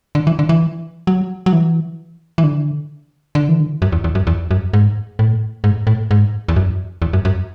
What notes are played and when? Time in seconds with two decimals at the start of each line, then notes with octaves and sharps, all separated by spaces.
0.15 D3
0.27 E3
0.39 D3
0.49 E3
1.07 F#3
1.46 F#3
1.53 E3
2.38 E3
2.44 D3
3.35 D3
3.49 E3
3.60 D3
3.82 F#2
3.92 E2
4.04 E2
4.15 F#2
4.27 E2
4.51 F#2
4.73 G#2
5.19 A2
5.64 G#2
5.87 A2
6.11 G#2
6.48 E2
6.56 F#2
7.02 E2
7.13 F#2
7.25 F#2